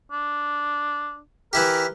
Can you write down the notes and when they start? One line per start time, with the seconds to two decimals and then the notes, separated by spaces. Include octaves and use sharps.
0.12 D4
1.53 E3 E4 G4 A#4